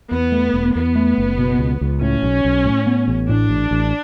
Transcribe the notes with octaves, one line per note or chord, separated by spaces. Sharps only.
E2 B3
A3
E1
E2 B3
A3
F#1
B2
C#2
C#2
A2 C#4
B1
B1
A2
B3
A1
A2 D4
A1
A1